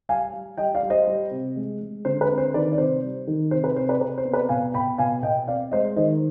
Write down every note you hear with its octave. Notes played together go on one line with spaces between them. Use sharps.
G3 F5 G#5
G3
G3 D#5 G5
D5 F5
G3
C5 D#5
G3
C3
G#3
G#3
D3 C5
B4
C4
C5
D#3 B4 D5
D5
C3 C5
G3
D#3
C3 C5
B4
C3 C5
B4 D5
C3 B4
C5
B3
B4 D5
B2 F5 G#5
B2 G5 B5
B2 F5 G#5
B2 D#5 G5
C4 D5 F5
G#3 C5 D#5
D#3 C5 D#5